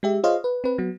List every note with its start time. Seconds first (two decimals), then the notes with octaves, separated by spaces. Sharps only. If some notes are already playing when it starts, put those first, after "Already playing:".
0.03 G#3 G4 E5
0.24 F4 G#4 C5 C#5 D#5 F5
0.44 B4
0.64 C4 B4
0.78 F#3 B3